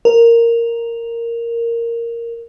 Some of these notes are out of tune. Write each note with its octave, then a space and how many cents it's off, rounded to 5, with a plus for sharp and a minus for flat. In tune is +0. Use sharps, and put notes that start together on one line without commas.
A#4 -5